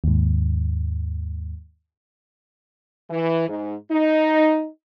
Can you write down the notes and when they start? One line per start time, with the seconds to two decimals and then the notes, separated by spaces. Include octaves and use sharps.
0.04 D#2 G#2
3.10 E3
3.48 G#2
3.90 D#4